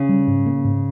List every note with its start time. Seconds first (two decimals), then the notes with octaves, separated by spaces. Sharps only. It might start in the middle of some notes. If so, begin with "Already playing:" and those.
Already playing: C#3
0.09 G3
0.27 G#2
0.46 A#3
0.64 G#2